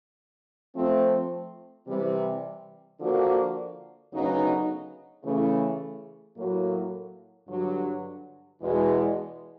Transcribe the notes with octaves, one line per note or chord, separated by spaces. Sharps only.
F3 A3 C4
C3 E3 G3
D3 F3 A#3 D4 F#4
D2 C#3 F#3 B3 D#4
C#3 E3 A3
A2 F#3 A#3
G2 D3 F#3
E2 B2 G#3